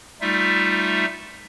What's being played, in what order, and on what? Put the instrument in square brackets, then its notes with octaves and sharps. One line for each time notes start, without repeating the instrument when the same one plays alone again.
[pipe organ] G3 A3 D#4 F4 E5